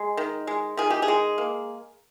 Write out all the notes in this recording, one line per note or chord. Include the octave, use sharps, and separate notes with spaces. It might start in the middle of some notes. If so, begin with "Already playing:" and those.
Already playing: G#3
D#3
G#3
D#3 G#4
G4
G#4
G#3
A#3